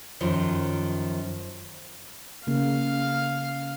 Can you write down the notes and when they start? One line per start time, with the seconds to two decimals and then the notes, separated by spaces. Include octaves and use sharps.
0.21 F#2 D#3 F3
2.47 C#3 A#3 F5